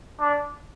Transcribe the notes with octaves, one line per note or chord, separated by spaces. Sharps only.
D4